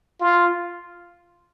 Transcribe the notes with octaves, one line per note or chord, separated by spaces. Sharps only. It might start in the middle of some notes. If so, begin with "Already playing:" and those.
F4